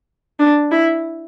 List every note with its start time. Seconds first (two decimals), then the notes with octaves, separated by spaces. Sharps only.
0.39 D4
0.72 E4